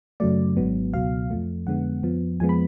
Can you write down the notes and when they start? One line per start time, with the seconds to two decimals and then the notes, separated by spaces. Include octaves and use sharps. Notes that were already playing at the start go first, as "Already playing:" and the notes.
0.20 F#2 C#3 F#3 A3 D5
0.57 G#1 G#2 F#3 B3
0.93 C#2 B2 F#3 F5
1.30 F2 F3 A3
1.67 F2 D3 G#3 B3 F#5
2.03 F2 F3 B3
2.40 F2 F3 G#3 B3 G#5
2.49 B5